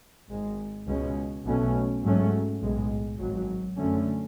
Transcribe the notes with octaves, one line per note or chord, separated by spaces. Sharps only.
G#1 G#2 G#3
C#2 B2 G#3 C#4
B1 B2 A3 C#4
G#2 F#3 A3 C#4
B1 A2 G#3
G#1 G#2 F#3
F#2 D3 A3 C#4